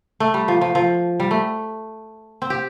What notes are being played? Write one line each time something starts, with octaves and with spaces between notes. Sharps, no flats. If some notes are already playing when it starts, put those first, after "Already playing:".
A3
G3
F3
F3
F3
G3
A3
C4
G4